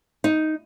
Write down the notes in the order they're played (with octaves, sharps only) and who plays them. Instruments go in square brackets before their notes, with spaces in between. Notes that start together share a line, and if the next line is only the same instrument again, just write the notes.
[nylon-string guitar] D#4